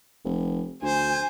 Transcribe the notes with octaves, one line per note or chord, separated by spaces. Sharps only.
F1
D2 C5 G#5